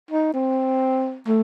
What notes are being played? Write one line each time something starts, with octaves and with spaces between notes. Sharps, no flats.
D#4
C4
A3